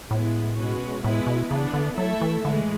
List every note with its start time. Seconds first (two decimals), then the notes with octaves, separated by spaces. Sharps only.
0.11 A2 G#3 B3 E4
0.57 B2 G#3 C#4 F#4 B4
1.03 A2 G#3 B3 E4 B4
1.27 B2
1.50 C#3 E3 B3 D4
1.74 D3
1.97 F#3 A3 E4 A4 E5
2.21 E3
2.44 A2 D3 E3 G#3